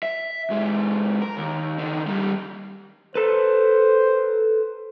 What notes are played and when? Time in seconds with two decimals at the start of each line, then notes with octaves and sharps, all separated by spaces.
0.03 E5
0.50 F#2 G#3
1.22 A#4
1.37 D#2
1.78 D3 D#3
2.08 G3 A#3
3.15 A4 B4 C5